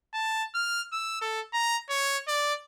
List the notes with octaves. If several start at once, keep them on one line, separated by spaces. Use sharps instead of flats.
A5
F6
E6
A4
A#5
C#5
D5